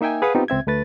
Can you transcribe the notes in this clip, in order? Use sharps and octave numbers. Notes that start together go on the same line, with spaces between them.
A#3 D#4 E5 G5 G#5
G#4 B4 F5 F#5 D#6
B3 C4 D#4 F4 G4
C#2 C4 E5 G#6
D2 A3 B4 A6